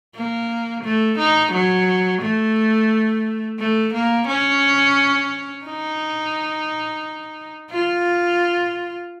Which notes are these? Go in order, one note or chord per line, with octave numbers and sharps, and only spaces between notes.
A#3
A3
D#4
F#3
A3
A3
A#3
C#4
D#4
F4